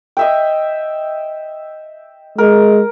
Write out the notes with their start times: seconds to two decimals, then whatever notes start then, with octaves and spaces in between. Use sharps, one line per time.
0.17 D#5 E5 G5
2.38 G#3 A#4